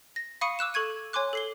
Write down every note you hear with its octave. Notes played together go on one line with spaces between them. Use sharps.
A#6
F5 B5 C#6 D#6 C#7 D#7
D6 E6 F#6 E7
A4 C#6 G#6 D#7
C#5 G#5 C6 D6 F#6
A4 C7 G7